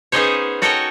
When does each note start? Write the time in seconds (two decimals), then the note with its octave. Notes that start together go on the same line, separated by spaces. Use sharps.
0.12 B3 C#4 D#4 G#4 C5 C#5
0.62 F#4 A4 A#4 C#5 D#5 G5